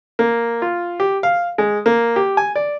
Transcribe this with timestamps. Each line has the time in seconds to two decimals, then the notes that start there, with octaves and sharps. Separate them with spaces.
0.19 A#3
0.62 F4
1.00 G4
1.23 F5
1.58 G#3
1.86 A#3
2.16 G4
2.37 G#5
2.56 D5